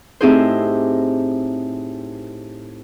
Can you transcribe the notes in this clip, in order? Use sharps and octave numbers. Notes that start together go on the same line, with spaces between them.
A2 C4 D#4 G4 G#4 C5